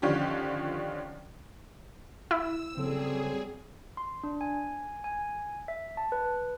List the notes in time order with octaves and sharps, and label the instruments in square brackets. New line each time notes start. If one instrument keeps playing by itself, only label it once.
[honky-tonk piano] D3 D#3 F3 C#4 D4 G4
[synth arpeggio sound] E4 [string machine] E6
[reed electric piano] C#3 A4 [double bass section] F#3 G3 C4 [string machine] G#4
[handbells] C6
D4
G#5
G#5
E5
A5
B4